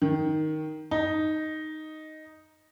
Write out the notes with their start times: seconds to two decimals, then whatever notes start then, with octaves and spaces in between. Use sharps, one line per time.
0.02 D#3
0.91 D#4